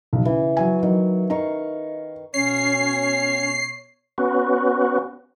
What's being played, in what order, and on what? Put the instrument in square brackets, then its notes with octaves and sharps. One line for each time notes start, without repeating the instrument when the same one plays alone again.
[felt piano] B1
[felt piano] C#3 [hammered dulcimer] E3
[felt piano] F#3 G#5
[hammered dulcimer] D#3 [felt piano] F#3
[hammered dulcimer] D#3 F5 C#6 [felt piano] A#5
[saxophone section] B2 C#5 [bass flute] C#4 [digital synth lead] C7
[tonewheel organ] B3 C#4 F#4